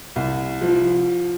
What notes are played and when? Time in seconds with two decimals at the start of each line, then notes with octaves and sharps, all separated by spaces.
0.16 C2
0.61 F3